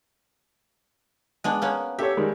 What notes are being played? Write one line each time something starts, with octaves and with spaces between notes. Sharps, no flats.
G#3 B3 D4
A#3 B3 C#4
G4 A4 C#5 E5
D#3 G3 G#3